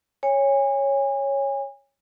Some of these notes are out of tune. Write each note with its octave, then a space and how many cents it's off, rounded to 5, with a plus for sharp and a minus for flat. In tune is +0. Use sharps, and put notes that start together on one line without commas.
C#5 -5 G#5 -30